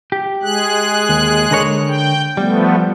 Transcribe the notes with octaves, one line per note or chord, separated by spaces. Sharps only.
G4
G#3 G#4 F#6
D#2
D3 A#4 C#5
G5
F3 G3 A3 B3